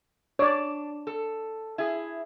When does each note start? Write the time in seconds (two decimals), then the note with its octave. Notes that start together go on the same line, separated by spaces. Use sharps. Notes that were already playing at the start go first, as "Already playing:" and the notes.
0.39 D4 C#5 D5
1.07 A4
1.78 E4 G#4